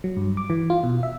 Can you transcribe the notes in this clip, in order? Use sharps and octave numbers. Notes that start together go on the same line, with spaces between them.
F#3
G2
D6
E3
F4
B2
E5